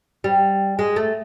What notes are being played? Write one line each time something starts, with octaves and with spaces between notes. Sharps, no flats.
G3
G#3
A3